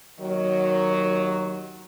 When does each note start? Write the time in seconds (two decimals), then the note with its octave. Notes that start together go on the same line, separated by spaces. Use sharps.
0.20 D#2 D#3 F#3